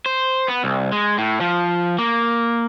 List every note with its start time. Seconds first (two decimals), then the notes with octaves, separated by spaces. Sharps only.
0.06 C5
0.48 B3
0.64 C2
0.92 G#3
1.18 A2
1.41 F3
1.99 A#3